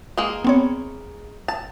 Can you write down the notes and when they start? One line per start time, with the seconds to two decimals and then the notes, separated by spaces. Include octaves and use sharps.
0.18 G#3 A#3
0.45 B3 C4 C#5
1.48 A5